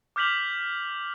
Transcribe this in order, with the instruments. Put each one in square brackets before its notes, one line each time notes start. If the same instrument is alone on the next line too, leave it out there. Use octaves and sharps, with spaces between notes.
[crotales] D6 F6 G6 B6 F7 F#7